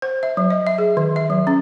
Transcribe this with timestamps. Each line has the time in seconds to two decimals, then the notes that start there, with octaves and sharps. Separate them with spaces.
0.02 C5
0.23 E5
0.37 F#3
0.50 D#5
0.67 E5
0.78 G#4
0.97 D#3
1.16 E5
1.30 F#3
1.47 C#4